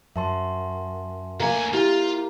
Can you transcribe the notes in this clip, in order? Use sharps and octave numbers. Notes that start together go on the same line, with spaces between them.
F#2 E5 A5 C6
D2 A#3 G#5 B5
E4 F4 G4